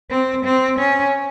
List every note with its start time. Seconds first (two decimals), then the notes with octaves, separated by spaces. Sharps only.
0.10 C4
0.45 C4
0.79 C#4